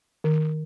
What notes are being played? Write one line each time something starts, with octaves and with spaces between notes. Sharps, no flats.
D#3